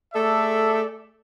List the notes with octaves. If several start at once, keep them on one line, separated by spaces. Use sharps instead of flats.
A3 G#4 A4 D5 E5